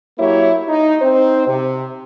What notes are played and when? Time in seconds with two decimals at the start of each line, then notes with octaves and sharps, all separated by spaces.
0.18 F#3 A#3 E4 G4 C#5
0.67 D#4
1.00 C4 D#4 C5
1.46 C3